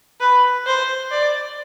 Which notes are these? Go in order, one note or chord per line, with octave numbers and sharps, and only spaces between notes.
B4
C5
D5